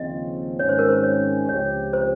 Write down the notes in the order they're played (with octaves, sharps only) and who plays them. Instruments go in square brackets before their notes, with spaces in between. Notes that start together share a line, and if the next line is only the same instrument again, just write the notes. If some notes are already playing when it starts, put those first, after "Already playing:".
Already playing: [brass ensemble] D#2 C#3 F3 C4 [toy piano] D#5
[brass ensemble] G#1 G#2 D#3 G#3 C#4 [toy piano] C#5
[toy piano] C5
A#4
C5
C#5
[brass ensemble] C#2 C3 F3 C4 G4 [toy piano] C#5
[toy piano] C5